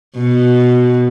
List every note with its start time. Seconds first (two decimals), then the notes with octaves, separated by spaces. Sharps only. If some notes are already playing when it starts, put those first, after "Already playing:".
0.17 B2